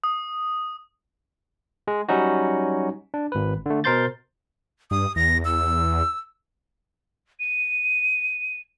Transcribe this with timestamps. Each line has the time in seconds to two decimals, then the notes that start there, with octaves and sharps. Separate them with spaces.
0.04 D#6
1.88 G#3
2.09 F#3 G3 C#4 D#4 F#4
3.14 D4
3.32 G#1 B4
3.66 D3 A3
3.84 B2 A#4 C5 C6 G6 A6
4.91 G2 D#6
5.16 E2 A#6
5.45 E6
7.40 D#7